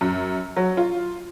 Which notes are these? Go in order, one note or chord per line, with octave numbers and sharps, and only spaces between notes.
F#2
F#3
F4